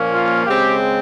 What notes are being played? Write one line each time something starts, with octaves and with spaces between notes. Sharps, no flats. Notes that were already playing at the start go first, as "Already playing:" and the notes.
Already playing: A#2 F3 A#3 C#4
F4
C#3 G#3 C4 G4